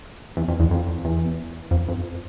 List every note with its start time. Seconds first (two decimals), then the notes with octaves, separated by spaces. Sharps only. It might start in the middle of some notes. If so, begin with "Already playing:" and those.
0.37 E2
0.48 F2
0.60 E2
0.71 F2
1.05 E2
1.71 F2
1.88 F2